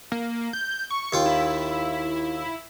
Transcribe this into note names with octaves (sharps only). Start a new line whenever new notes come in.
A#3
G6
C#6
D#2 F4 G5
E4